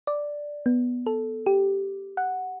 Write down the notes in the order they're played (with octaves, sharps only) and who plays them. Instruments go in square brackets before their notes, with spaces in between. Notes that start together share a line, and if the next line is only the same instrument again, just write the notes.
[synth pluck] D5
B3
A4
G4
F#5